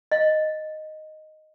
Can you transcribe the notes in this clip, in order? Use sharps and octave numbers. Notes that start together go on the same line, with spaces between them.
D#5 F5